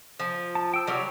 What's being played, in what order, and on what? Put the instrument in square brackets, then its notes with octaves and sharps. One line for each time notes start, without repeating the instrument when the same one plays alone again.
[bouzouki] F3
[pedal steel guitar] A5
G5 E6
[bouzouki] F#3 G3 [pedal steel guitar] C#5